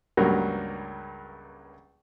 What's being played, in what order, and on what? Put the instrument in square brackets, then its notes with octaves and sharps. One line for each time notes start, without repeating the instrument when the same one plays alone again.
[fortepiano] C#2 G2 F#3 A#3